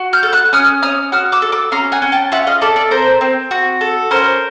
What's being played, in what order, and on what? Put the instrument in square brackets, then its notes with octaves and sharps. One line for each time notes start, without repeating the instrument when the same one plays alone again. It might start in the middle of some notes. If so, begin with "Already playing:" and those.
Already playing: [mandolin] F#4
F6 G6
A4
E6 F#6
C#4 D#6 F6
C#4 D#6 F6
F#4 D#6 F6
D6 E6
A4
D6 E6
C#4 A#5 C6
F#5 G#5
C#4
G5 A5
F4 E5 F#5
D#5 F5
A4 D5 E5
D5 E5
C4 A#4 C5
C4
F#4
A4
C#4 A#4 C5